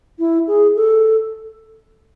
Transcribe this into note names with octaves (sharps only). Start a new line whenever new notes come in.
E4
G#4
A4